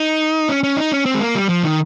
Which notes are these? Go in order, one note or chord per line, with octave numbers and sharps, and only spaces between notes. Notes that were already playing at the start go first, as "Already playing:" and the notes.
Already playing: D#4
C#4
C#4
D#4
C#4
C4
G#3
A#3
G3
F3
D#3